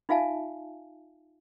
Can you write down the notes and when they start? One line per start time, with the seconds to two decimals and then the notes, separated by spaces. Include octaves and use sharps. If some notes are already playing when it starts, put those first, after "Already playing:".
0.09 D#4 F4 E5 F5 G#5 A5